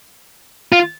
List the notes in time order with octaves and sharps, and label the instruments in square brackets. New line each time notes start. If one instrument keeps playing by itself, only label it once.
[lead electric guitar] F4